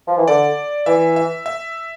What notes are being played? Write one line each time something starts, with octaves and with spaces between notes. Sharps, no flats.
F3
E3
D3 D5
E3 E5
E5
E5